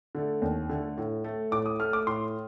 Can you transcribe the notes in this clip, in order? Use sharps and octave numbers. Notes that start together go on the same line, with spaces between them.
D3 A3
D#2
D3 A3
A2
A3
A2 D6
D#6
A3 F6
D6
A2 C6